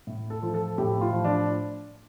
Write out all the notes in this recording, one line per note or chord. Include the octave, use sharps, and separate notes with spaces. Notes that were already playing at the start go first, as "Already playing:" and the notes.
A2
A4
F3
A4
A2 G4
F4
F3
D4